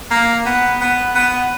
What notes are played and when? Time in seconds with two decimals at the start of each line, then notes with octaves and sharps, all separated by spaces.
0.11 A#3
0.45 B3
0.81 B3
1.15 B3